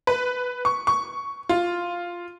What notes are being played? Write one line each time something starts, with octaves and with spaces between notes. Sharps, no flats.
B4
C#6
C#6
F4